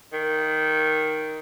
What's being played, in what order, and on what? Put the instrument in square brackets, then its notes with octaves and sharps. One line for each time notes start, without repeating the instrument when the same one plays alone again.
[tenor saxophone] D#3